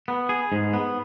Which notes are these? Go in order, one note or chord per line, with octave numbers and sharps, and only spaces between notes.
B3
G#4
G#2
B3